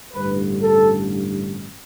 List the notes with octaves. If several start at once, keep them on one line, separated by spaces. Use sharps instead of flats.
A1 G2 D3 B4
A4